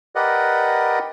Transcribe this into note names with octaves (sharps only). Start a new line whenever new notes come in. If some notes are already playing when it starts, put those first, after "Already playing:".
G4 A#4 B4 D5 D#5 F#5